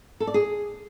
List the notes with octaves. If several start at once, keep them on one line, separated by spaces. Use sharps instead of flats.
A4
D5
G#4